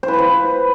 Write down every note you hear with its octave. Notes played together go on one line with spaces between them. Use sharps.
C5
B4
C5
B4